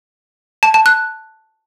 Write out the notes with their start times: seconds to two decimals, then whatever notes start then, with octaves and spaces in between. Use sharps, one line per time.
0.63 A5
0.74 A5
0.86 F#6